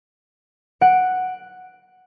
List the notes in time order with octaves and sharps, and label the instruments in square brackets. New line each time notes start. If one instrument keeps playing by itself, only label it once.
[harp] F#5 D7